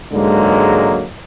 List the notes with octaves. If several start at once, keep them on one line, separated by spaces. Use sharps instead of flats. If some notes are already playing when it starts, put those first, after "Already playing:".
G#2 D3 F#3 G#3 A#3